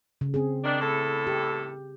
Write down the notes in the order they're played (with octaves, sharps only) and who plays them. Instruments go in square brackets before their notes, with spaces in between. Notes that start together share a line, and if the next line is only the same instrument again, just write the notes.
[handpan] C#3
C4 G#4
[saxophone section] D#3 D4
E2 A2 A4
[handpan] G4